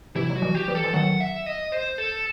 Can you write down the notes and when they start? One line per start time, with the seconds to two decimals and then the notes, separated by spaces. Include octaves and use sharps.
0.15 C3 E3 E4
0.30 F#3
0.36 F#4
0.42 E3 G3
0.55 G4
0.68 E3 G3
0.75 A4
0.84 E3
0.94 D#3 F#3 F#5
1.20 E5
1.46 D#5
1.72 C5
1.98 A4